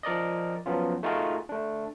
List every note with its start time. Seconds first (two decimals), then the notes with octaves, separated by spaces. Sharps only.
0.03 F3 A#4 D5 D#5
0.66 F3 F#3 B3 C#4 F4
1.03 A3 D#4 F4 F#4 G#4 A#4
1.49 A3 D4